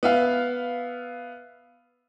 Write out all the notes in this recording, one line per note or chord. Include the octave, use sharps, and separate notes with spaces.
B3 E5 F5